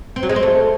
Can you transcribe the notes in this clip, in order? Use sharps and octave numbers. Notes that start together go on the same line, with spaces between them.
C4
F#3
G#3
C4
A3